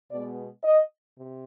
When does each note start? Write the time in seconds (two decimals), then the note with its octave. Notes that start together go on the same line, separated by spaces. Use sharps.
0.10 B2 G#3 B3 D5
0.63 D#5
1.16 C3